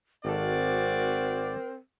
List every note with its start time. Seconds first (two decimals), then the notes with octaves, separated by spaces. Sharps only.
0.25 G#1 C4 F#4 A4 A#4 D5